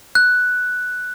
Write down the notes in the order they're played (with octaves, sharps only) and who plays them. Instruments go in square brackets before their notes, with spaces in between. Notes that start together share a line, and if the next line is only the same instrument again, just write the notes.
[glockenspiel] F#6